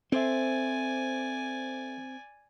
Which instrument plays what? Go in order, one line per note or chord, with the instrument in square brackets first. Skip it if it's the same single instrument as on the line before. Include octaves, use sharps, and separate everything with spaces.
[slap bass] C4 [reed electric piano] A4 C5 E5 [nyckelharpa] D5 G#5